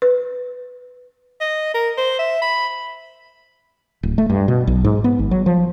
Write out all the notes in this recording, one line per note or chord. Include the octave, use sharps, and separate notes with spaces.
B4
D#5
A#4
C5
E5
B5
D1
A3
G2
B2
B1
G#2
B3
G#1
F#3
F3